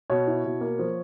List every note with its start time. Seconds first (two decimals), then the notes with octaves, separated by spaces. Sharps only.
0.10 B2 C#5
0.27 E4
0.45 B2
0.61 A#3
0.79 F3